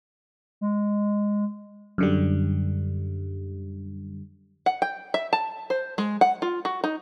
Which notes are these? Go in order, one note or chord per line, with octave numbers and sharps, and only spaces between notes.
G#3
F#2 D3 G3
F#5
G5
E5
A5
C5
G#3
F#5
F4
F#4
D#4